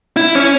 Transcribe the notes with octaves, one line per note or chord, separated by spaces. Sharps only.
E4
C#4